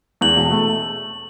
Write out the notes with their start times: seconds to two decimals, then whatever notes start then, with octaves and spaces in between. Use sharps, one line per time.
0.21 E2 F#7
0.36 E1
0.51 A3